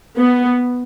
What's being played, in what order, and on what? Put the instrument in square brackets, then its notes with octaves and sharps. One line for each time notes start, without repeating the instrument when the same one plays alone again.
[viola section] B3